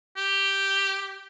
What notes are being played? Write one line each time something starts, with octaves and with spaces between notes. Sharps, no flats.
G4